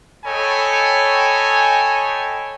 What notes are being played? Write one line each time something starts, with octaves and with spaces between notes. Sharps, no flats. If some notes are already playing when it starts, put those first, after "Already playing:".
A4 C#5 D#5 G5 G#5 B5